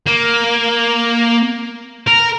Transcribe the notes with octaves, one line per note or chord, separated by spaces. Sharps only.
A#3
A#4